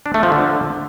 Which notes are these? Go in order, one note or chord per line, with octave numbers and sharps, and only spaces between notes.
D4
A3
F3
D3